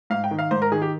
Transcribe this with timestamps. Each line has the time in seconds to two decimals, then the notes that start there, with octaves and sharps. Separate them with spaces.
0.10 G#2 F5
0.24 G5
0.31 D#3
0.39 F5
0.51 G#2 C5
0.62 A#4
0.72 D#3 G#4
0.82 G4